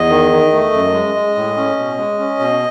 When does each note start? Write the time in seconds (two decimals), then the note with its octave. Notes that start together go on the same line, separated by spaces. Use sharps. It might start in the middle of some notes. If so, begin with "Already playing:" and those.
Already playing: E2 D#5
0.09 D#3
0.31 D#3
0.52 A3
0.73 F#2
0.93 G#3
1.14 G#3
1.35 A2
1.56 C#4
1.77 B2
1.98 G#3
2.19 C#4
2.39 B2